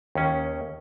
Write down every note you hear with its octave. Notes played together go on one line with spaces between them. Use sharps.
D#2 C#4